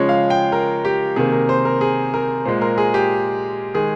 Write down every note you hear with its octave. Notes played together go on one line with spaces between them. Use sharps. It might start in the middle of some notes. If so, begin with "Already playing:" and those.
Already playing: C#3 F3 G#3 C#5
F5
G5
A#4
G4
C3 D#3 A#3 G#4
A#4
C5
A#4
G#4
A#4
A#2 G#3 C5
A#4
G#4
G4
D#3 G#3 G#4